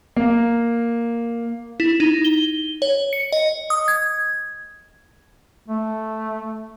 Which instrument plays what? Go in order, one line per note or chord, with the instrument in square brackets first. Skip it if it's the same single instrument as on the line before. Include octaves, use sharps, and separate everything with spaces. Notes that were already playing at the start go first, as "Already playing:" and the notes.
[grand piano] A#3
[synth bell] E4
D#4
G7
C#5
C#7
D#5
D#6
G#6
[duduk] A3